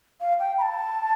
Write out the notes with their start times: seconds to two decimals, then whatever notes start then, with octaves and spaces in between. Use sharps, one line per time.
0.20 F5
0.39 G5
0.58 B5
0.62 A5